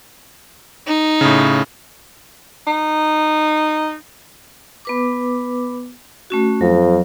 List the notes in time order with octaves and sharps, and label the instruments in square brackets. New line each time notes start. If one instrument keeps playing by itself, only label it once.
[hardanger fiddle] D#4
[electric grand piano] A2 C#3
[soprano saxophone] D#4
[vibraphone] B3 B4 D6
A3 C#4 F#4
[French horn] F2 [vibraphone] F#3